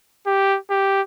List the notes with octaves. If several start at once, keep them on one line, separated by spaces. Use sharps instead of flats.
G4
G4